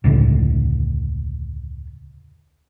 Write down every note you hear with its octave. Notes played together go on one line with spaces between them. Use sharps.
E1 C#2 A2 D3